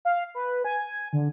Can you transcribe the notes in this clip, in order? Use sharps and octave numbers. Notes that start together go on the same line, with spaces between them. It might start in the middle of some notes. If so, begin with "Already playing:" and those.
F5
B4
G#5
D3